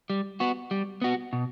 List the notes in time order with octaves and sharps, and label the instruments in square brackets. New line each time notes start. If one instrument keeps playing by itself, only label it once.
[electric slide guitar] G3
B3 F#4
G3
B3 F#4
B2